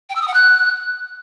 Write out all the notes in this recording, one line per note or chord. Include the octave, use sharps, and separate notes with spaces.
G5
E6
D#6
F#5
F#6